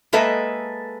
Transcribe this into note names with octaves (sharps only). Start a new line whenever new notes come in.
G#3 A#3 A4 B4 D#5 E5